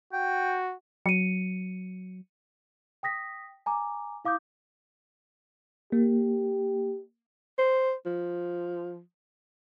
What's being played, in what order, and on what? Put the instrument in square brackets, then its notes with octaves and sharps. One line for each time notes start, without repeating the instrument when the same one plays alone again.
[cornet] F#4 [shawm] G5
[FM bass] F#3 [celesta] C#7 D#7
[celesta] G5 D#6 A#6 B6
G#5 A#5 D6
E4 F5 D6 D#6 G6
[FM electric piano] A#3 [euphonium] G4
[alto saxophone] C5
F3